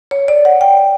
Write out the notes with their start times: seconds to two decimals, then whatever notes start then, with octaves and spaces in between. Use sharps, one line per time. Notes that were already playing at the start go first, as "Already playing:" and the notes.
0.11 C#5
0.28 D5
0.45 F#5
0.61 G5